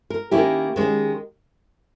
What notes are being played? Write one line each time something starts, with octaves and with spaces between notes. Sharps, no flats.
A#4
D#3 A#3 C#4 E4 G4
D#3 G#3 C#4